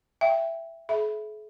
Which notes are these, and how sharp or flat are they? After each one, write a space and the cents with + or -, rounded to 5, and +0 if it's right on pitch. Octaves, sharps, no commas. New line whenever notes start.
E5 +10 G5 +10
G#4 +45 E5 +0 B5 +0